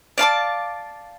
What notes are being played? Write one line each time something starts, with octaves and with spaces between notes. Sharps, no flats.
D5 F5 A5 D6